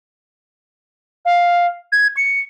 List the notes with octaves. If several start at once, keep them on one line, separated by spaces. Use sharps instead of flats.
F5
G#6
C#7